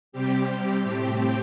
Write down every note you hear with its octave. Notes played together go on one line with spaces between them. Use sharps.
C3 G3 C4 G4
A2 A3 C4 G4